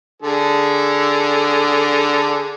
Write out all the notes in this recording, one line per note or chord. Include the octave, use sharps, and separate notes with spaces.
D3 G#4 A4